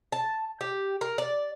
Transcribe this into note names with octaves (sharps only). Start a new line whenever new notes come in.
A5
G4
A#4
D5